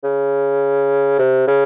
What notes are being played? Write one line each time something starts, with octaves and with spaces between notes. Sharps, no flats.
C#3
C3
C#3